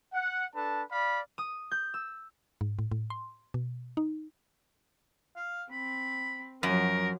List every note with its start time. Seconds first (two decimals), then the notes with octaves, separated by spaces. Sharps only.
0.13 F#5
0.55 D4 A4 B4 A5
0.92 D5 F5 B5
1.38 D#6
1.71 G6
1.94 E6
2.61 G#2
2.79 A2
2.91 A2
3.10 C6
3.54 B2
3.97 D#4
5.36 F5
5.71 C4 B5
6.63 F#2 F3 F#3 A#4